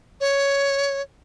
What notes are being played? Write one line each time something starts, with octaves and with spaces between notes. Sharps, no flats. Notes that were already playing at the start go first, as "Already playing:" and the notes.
C#5